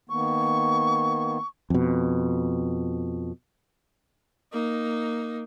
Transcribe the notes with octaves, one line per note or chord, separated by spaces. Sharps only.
D#3 A#3 B3 C#6
F2 B2
A#3 D#4